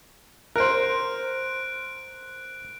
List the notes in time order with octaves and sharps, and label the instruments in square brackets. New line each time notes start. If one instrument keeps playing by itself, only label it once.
[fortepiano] A#4 C5 [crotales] F#6 D7